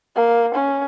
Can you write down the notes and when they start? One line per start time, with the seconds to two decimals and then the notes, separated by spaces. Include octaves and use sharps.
0.15 A#3
0.55 C#4